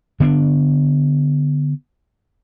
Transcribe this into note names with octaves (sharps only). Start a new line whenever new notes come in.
D3 B3 C4 D4